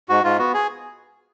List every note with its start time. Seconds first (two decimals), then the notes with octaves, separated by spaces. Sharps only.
0.09 G#2 F#4
0.24 G#2 F4
0.39 B3 F#4
0.54 G#4